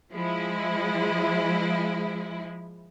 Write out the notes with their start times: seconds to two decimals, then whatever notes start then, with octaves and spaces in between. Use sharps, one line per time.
0.12 F3 G#3 E4